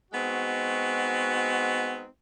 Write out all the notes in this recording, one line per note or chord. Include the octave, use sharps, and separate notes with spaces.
G#3 B3 C4 D#4 F#4